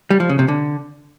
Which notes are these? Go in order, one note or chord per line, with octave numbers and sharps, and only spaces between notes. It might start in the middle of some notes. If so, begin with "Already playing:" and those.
G3
F3
C#3
C3
D3